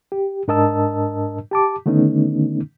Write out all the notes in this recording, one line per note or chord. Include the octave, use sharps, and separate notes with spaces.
G4
G#2 D4 A#4 D#5 A5 E6
G4 A5 D6
D3 D#3 A3 B3 C#4 D#4